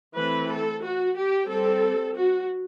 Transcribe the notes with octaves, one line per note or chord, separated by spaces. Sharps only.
E3 A3 C4 B4
A4
F#4
G4
G3 C4 A4
F#4